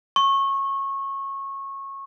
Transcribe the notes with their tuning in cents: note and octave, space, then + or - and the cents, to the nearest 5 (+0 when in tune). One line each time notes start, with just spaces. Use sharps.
C#6 -20